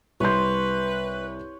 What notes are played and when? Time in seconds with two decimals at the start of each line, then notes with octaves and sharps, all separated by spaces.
0.20 C2 B4 C#5 C6 G6